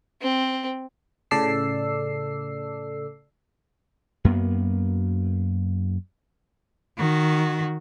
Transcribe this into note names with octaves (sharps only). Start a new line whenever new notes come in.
C4
A2 C#3 A4 D5 E6 C7
F#2 A#3 B3
D#3 F#4